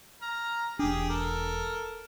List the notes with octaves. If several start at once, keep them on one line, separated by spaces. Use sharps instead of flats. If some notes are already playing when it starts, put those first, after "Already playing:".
A#5 F6
E1 D4 G4 G#4
A4 A#4